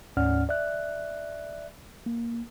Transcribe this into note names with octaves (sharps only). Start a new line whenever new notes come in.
D2 G#2 C#4 D5 F#5 F6
D5 E5 F#6
A#3